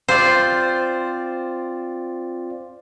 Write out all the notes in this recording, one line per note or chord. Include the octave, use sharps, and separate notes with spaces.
C4 F4 C5 D5